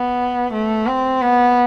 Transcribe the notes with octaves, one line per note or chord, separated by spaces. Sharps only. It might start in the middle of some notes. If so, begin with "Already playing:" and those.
Already playing: B3
A3
C4
B3